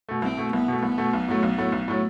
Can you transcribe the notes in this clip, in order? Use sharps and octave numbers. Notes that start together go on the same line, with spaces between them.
B2 A3
C2 C4
B2 A3
C2 B3
B2 A3
C2 B3
B2 A3
B1
A2 F#3 A3
B1
A2 F#3 A3
B1
A2 F#3 A3